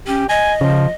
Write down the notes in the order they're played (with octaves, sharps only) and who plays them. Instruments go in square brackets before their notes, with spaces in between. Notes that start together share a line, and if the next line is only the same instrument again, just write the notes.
[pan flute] C#4 [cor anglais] G4
[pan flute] D#5 [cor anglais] G#5
[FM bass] C#3 [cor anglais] F3